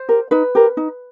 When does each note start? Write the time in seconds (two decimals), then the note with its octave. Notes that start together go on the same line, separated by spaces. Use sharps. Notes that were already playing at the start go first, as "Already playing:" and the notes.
Already playing: C5
0.09 G4 A#4
0.31 D#4 B4
0.55 G4 A#4
0.77 D#4